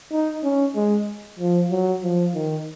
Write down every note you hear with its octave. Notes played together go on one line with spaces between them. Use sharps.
D#4
C#4
G#3
F3
F#3
F3
D#3